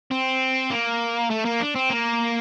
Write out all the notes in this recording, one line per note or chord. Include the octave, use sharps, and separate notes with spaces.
C4
A#3
A3
A#3
D4
C4
A#3